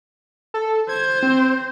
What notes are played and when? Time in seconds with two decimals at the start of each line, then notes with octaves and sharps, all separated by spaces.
0.54 A4
0.89 C5 G#6
1.23 C4